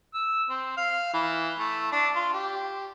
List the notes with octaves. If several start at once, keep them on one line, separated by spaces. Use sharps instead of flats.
E6
C4
F5
E3
A3
D4
F4
G4